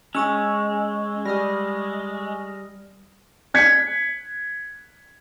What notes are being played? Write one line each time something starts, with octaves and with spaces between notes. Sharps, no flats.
G#3 C#4 G#5 C#6 E6
G3 D#6 F6 A#6
F#6 G#6 B6 C#7